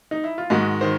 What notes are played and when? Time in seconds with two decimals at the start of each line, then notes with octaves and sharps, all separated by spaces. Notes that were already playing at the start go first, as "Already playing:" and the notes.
0.11 D#4
0.24 E4
0.38 F4
0.50 G#2 D#3 G#3 F#4
0.81 D#3 C5